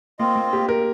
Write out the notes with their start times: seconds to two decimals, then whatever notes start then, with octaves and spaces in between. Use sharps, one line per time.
0.19 A#3 C4 F4 D#5
0.36 A#3
0.53 G4
0.69 A#4